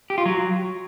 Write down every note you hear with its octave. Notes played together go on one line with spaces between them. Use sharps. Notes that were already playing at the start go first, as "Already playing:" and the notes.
G4
F4
F#3